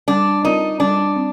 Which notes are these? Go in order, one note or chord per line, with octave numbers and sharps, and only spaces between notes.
G3 D4
C4 D#4 F4 A#4 D5
G3 D4
C4